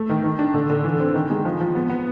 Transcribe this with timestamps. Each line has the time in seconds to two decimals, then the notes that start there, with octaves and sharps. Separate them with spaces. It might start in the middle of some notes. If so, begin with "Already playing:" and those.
Already playing: A3
0.09 D#3
0.24 D#3
0.39 D4
0.54 D3
0.70 D3
0.84 E3
1.00 C4
1.14 D#3
1.30 G#3
1.45 F3
1.60 F3
1.75 B3
1.90 B3